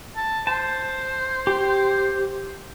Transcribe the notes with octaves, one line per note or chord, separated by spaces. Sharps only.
A5
C5 A5
G4